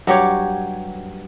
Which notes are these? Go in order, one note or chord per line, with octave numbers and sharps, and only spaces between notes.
G2 F#3 G4 C#5